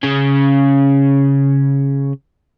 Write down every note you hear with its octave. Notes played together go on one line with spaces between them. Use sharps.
C#3 C#4